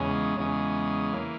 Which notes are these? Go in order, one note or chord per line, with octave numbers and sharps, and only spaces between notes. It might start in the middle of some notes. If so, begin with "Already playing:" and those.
Already playing: E2 C#3 G#3 C#4
E2 C#3 G#3 C#4
E3 A#3